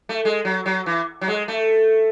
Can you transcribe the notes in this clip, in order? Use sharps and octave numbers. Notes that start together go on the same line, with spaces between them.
A3
G#3
F#3
F#3
E3
F#3
G#3
A3